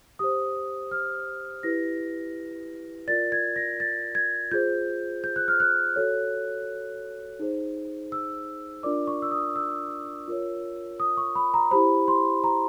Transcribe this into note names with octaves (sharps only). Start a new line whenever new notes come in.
G4 C5 D#6
F6
E4 G4 B4 A#6
F4 A#4 D5 A6
G#6
A#6
A6
G#6
F4 G#4 C5 G6
G6
F#6
F6
F#6
F#4 A4 C#5
D#4 G#4 C5
E6
D4 F4 A#4 D5 D6
C#6
E6
D#6
E6
F4 A#4 C#5
D#6
C#6
B5
A#5
E4 G4 C5 B5
C6
A#5